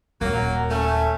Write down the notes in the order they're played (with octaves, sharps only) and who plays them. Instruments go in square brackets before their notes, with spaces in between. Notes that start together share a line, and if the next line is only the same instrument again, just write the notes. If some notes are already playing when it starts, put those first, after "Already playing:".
[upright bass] D#1 [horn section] F#3 A#3
[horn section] A3 C#4